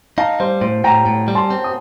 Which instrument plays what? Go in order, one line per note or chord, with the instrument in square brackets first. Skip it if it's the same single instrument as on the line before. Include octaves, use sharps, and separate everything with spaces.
[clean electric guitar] D#4 [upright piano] F5 A5
[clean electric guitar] G3 [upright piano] C5
[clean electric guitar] A2 [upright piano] C5
[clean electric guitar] A2 [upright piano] G5 A#5
[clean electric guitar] A2
G3
[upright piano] A5 C6
[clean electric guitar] C4
[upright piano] D#6